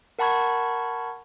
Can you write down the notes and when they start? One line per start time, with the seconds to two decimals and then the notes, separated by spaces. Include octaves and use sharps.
0.19 A#4 F#5 A5 B5 C#6 G#6